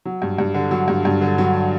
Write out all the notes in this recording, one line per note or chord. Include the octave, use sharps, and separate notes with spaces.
F#3
G2
G2
D3
F#3
G2
G2
D3
F#3